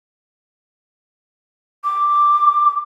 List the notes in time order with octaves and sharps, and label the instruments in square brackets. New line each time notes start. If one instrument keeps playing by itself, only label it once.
[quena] D6